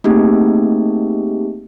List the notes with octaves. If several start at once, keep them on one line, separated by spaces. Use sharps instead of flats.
A3 A#3 C4 D#4 G4 G#4